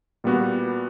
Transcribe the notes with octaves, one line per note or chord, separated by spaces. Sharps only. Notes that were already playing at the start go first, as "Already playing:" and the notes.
A#2 G3 B3 F#4